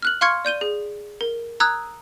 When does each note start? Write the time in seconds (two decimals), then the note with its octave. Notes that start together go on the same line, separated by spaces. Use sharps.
0.02 F6 F#6 F#7
0.21 F5 C6 C#6 F6 G#6 C#7
0.45 D5 G6 D#7 G7
0.61 G#4
1.21 A#4
1.60 A#5 D#6 E6 F#6 G#6